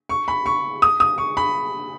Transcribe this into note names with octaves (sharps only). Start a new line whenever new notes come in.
C#6
B5
C#6
D#6
D#6
C#6
B5